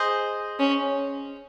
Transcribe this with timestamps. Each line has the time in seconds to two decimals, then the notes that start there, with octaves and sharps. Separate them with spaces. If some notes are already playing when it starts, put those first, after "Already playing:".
Already playing: G#4 C5 D#5
0.59 C#4